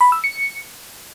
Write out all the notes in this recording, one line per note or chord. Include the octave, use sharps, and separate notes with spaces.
B5
E6
C#7